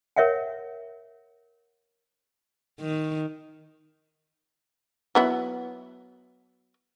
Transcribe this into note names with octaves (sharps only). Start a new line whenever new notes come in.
A#4 C#5 E5 F#5 G5
D#3
F#3 B3 E4